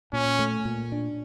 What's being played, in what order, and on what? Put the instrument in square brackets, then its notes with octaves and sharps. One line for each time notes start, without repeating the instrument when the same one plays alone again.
[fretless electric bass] A#2 [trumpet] C#4
[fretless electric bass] A3
A#2
D4